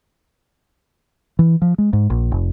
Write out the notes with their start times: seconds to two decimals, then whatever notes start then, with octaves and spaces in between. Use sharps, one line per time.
1.39 E3
1.62 F3
1.78 G#3
1.93 G#2
2.10 A#1
2.32 F1